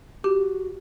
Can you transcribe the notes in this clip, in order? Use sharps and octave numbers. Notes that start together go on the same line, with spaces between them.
F#4 G4